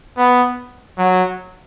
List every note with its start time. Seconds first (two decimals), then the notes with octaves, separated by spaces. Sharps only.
0.17 B3
0.98 F#3